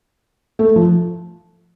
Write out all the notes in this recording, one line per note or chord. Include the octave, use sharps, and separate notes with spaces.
A3
F3